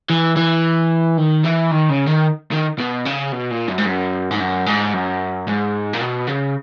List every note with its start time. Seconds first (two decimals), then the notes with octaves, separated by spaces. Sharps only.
0.10 E3
0.37 E3
1.18 D#3
1.44 E3
1.71 D#3
1.89 C#3
2.07 D#3
2.51 D#3
2.78 B2
3.05 C#3
3.32 B2
3.51 A#2
3.68 F#2
3.78 G#2
3.86 F#2
4.31 G#2
4.39 F#2
4.66 G#2
4.93 F#2
5.48 G#2
5.94 A#2
6.01 B2
6.27 C#3